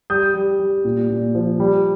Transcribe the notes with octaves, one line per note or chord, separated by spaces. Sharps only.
G3 D#6 G6
G3
G3
A#2
A#2
F3
G3